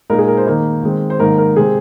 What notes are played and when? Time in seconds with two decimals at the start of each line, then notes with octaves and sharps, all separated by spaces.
0.10 A#2 G#3 D#4 A#4
0.19 G#4
0.28 A#4
0.37 C5
0.46 D#3 A#3 D#4
0.83 D#3 G#3 C4
1.10 C5
1.19 G#2 D#3 A#3 D#4 A#4
1.38 A#4
1.56 C3 G#3 C4 G#4